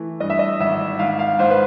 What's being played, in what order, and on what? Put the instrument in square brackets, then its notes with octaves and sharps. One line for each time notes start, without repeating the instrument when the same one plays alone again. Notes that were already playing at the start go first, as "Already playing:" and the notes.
Already playing: [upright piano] E3 A3
G2 D#5
E5
D#5
G#1 E5
G#2 F5
F5
G#2 C5
B4